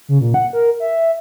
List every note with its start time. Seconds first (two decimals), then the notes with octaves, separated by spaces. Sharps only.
0.08 C#3
0.21 A#2
0.34 F#5
0.53 A#4
0.80 E5